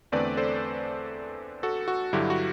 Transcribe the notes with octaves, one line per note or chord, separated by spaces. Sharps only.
E2 D3 A3 C4 B4 D5
A4 C5
F#4 A4
F#4
G2 D3 F#3 E4 G4
F#4